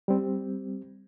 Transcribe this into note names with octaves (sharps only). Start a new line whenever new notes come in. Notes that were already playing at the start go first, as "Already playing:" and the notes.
G3 C4